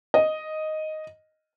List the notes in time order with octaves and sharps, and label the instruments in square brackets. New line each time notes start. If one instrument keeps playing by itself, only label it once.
[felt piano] D#5